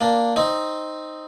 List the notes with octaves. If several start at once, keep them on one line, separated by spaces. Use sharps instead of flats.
A#3 D4
C4 D#4